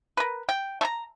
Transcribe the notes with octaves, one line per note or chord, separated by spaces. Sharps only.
A#4 B4
G5
A3 A#5